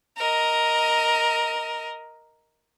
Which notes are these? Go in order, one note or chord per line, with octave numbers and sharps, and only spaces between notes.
A#4 D#5